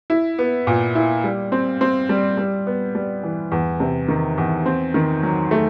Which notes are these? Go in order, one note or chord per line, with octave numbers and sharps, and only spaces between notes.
E4
B3
A#2
E4
G3
C4
C4
G3
G3
B3
G3
E3
E2
C3
D#3
E2
C4
D#3
F#3
A3